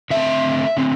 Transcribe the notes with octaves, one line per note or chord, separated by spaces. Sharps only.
D3 A3 C4 E5
D3 A3 C4